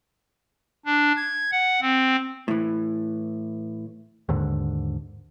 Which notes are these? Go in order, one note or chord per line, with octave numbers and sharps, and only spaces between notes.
D4
G#6
F#5
C4
A2 E3
D#2 G#2 D3